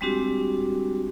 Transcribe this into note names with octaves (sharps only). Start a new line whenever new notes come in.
G3 G#3 C4 D4 F#4 G4